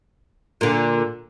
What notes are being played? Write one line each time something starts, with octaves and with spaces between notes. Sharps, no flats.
A#2 D3